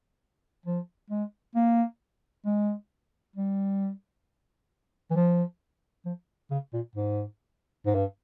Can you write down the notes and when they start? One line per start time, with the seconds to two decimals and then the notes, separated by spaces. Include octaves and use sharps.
0.66 F3
1.10 G#3
1.55 A#3
2.46 G#3
3.36 G3
5.10 E3
5.16 F3
6.05 F3
6.51 C#3
6.73 A#2
6.95 G#2
7.86 G#2
7.95 G2